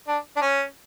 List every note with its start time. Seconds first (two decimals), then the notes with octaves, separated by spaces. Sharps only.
0.07 D4
0.37 D4
0.41 C#4